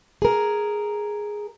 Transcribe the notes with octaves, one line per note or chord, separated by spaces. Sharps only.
G#4 A#4